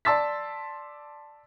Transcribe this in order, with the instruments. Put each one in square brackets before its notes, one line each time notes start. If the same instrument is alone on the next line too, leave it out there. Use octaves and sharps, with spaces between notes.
[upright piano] D5 A5 C6 E6 A6 B6